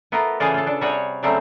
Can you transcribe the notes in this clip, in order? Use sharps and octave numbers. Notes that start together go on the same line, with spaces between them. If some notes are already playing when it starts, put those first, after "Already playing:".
A3 B3 F4 A#4
C#3 E3 F4 G#4 A4 D5
F4 A4
D4 A4
C3 G3 F#4 G#4 C#5 F#5
C#3 F#3 G3 A3 C4